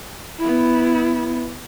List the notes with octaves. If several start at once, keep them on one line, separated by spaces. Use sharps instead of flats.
B3 E4